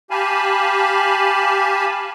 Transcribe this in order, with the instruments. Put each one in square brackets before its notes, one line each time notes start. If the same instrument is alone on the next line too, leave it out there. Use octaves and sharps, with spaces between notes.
[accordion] G4 F5 G#5 A5 B5